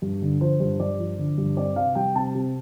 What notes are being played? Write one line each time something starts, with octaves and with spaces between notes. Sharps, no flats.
G2
D3
F3 C5
G2
G2 D5
F3
D3
G2
C4 D5
C3 F5
G3 G5
C3 A5
C3